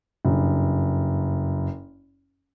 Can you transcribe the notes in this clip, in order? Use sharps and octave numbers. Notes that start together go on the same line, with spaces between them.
F#1 G2